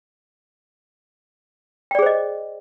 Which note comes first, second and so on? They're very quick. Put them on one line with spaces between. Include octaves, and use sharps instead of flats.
G5 D5 G#4 C5 D#5